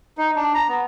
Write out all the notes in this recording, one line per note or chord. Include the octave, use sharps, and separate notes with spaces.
D#4
D4
A#5
B3